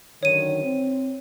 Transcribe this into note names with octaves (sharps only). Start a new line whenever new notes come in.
F#2 D3 D#3 C#5 D#7
C4